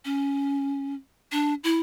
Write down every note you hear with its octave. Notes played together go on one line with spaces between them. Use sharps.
C#4
D4
E4